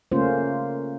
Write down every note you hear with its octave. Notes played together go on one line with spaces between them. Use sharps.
C#3 A3 A#3 C#4 F4 C5